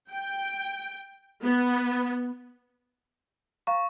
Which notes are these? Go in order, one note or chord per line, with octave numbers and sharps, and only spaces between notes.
G5
B3
F5 A#5 C#6